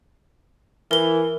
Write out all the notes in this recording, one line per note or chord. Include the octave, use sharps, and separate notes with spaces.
E3 A#4 G7